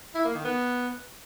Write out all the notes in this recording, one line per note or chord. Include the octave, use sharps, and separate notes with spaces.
E4
A#3
D#3
B3